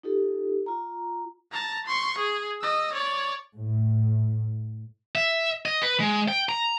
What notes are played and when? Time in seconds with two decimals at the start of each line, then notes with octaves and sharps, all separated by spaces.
0.03 D#4 F4 G4 A4
0.66 F4 A#5
1.52 A5 A#5
1.86 C6 C#6
2.18 G#4
2.61 D#5 E6
2.93 C#5 D5
3.57 A2
5.15 E5
5.66 D#5
5.83 B4
6.00 G#3
6.28 G5
6.49 A#5